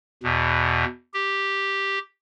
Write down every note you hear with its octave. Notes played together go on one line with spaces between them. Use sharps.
E2 B2
G4